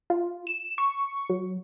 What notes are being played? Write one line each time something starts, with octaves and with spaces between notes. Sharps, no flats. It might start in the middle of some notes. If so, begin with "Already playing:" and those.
F4
E7
C#6
F#3